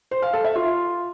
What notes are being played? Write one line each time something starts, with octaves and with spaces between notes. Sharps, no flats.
C5
F5
A4
E5
F4